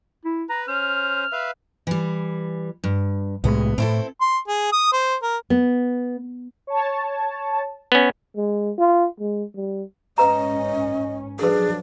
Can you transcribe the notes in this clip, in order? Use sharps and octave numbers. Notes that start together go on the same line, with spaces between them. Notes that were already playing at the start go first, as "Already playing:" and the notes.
E4
B4 A#5
C#4 C5 F6
B4 E5 F5
E3 G3
G2
C2 A2 G#3 B3
A2 C4 E4 A4
C6
G#4
D#6
C5
A#4
B3
C#5 A5
B3 C#4
G#3
F4
G#3
G3
G#2 C#4 B4 D#5 A#5
F3 F#3 D4 G#4 A4 B4